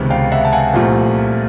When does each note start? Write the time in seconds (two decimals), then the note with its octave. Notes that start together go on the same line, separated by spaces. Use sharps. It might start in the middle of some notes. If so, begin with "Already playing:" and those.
Already playing: C#2 C3 D#3 G#3 B3
0.10 F5 G5
0.32 E5 F#5
0.45 A5
0.53 F#5 G#5
0.74 C2 A#2 F3 A3